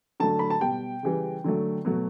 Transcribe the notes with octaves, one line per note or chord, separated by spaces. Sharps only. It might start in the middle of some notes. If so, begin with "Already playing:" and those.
D3 F#3 A3 A5
B5
A5
B2 G3 G5
C#3 E3 G3
D3 F#3 A3
B2 F#3 A3